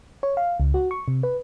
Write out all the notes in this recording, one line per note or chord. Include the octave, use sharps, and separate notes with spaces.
C#5
F5
C#2
F#4
C#6
C3
B4